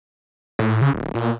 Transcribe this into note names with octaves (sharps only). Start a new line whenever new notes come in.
A2
C#3
D1
A#2